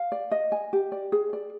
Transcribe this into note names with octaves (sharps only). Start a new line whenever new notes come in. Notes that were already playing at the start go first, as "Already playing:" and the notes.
Already playing: F5
D5
D#5
G#5
G4
D5
G#4
D5